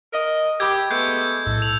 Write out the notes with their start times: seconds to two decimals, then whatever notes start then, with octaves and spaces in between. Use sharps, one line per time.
0.13 A#4 D#5
0.60 G4 B5 D6 E6 G#6
0.91 G#3 A3 B3 G6
1.46 B1 A2 A4
1.62 E6 F7